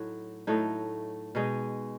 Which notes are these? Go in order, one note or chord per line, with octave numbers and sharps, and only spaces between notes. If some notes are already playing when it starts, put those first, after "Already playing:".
Already playing: A2 F#3 D#4
A2 F#3 A3 D#4
B2 G#3 D#4